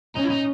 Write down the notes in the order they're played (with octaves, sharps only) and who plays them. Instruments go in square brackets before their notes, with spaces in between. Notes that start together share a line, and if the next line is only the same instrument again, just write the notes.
[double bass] C#4 [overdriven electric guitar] D#4
[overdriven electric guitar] E4
D#4